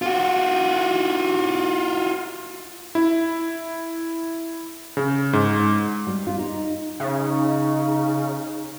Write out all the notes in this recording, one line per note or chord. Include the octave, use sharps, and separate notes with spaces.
F4 F#4
E4
C#3
G#2
G3
F4
D#4
C#3 D#4